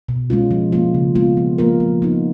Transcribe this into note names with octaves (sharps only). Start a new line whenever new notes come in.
B2
G#3 C#4 F4
F3
A#3 F4
C#3
G#3 B3 F4
F3
A#3 F4 A#4
F3
B3 D#4